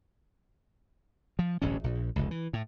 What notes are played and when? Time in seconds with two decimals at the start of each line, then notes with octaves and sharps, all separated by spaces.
1.39 F3
1.62 D1 A1 G2 C#4
1.84 A#1
2.16 F1 C#2
2.31 E3
2.53 A2